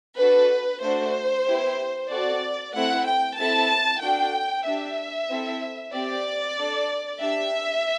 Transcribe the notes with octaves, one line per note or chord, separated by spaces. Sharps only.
D4 F#4 A4 B4
A3 D4 F#4 C5
B3 E4 G4
C4 F#4 A4 D5
A3 C4 E4 F#5
G5
C4 E4 A4 A5
D4 F#4 A4 G5
D4 G4 E5
C4 E4 A4
C4 G4 D5
D4 A4
D4 G4 E5